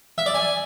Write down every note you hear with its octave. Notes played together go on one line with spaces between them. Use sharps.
E5
D5
G#5